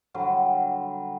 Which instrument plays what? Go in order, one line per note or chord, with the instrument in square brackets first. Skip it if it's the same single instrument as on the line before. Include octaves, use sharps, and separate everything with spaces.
[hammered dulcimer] D3 F#3 G3